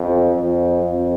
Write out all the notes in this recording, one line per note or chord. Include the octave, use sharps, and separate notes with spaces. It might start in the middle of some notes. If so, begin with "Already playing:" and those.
Already playing: F2
F2
F2